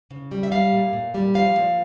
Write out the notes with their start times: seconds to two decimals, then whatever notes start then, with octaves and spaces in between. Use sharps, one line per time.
0.10 C#3
0.31 G3
0.43 E5
0.51 G3 F5
0.73 A#2
0.93 A#2
1.14 G3
1.34 F3 F5
1.56 A#2